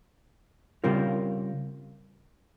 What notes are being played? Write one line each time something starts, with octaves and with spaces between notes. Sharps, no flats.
C#3 G3 C4 F4 A#4